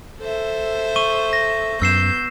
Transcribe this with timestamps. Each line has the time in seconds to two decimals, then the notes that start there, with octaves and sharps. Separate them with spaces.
0.20 A4 C5 E5
0.96 C#6 D#7 G7
1.33 A#6
1.82 F#2 B3 E6 G6 C7 E7